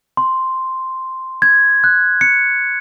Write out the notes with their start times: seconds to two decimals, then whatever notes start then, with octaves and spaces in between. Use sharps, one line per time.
0.17 C6
1.42 G#6
1.84 F#6
2.21 C#7